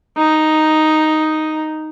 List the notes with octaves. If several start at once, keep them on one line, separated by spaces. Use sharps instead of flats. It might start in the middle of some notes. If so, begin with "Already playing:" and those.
D#4